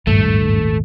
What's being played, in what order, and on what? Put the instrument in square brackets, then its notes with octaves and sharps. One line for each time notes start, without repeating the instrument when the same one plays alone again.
[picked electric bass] D#1 G#1 [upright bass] G2 [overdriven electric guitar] A3